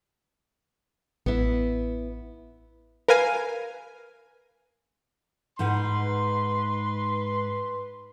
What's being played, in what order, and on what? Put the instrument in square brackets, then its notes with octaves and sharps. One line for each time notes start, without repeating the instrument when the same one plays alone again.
[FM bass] A1 [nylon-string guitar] B3 E4
[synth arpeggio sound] A#4 B4 F5 G#5
[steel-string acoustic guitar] G#2 D#4 F#5 [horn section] B4 C6